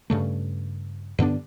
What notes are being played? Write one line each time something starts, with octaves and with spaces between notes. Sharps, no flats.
G2 C#3 A3
G2 D3 B3 D4